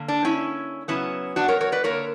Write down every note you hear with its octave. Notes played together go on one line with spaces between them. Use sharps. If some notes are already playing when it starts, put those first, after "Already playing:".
Already playing: D3 A#3
D4
C#4 E4
C#3 F#3 B3 C#4 E4
D4 F#4
A#4 C#5
A#4 C#5
B4 D5
D3 A#3 A#4 C#5